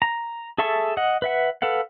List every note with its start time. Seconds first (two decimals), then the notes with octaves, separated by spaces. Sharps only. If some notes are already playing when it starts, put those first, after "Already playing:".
0.02 A#5
0.58 G#4 A4 E5 A5 C#6
0.97 D#5 F#5
1.22 B4 E5 F#5
1.62 A4 B4 F5 F#5